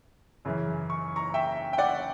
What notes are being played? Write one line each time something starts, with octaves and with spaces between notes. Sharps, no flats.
F#2 C#3 E3
C#6
A#5 C#6
E5 G5
G5
D5 F#5